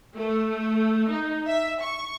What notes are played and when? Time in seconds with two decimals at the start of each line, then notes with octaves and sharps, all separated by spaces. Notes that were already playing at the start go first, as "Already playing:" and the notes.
0.16 A3
1.11 D#4
1.47 E5
1.82 C#6